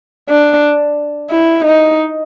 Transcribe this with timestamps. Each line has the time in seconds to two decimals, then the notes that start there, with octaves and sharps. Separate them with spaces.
0.29 D4
1.31 E4
1.65 D#4